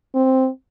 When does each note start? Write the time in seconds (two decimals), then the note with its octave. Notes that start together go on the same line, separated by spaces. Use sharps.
0.15 C4